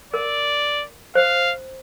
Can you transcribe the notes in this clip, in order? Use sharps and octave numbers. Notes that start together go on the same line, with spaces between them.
A#4 D5
C5 F5